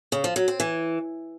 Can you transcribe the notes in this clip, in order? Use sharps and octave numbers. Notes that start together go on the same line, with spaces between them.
C#3
F3
F#3
C4
E3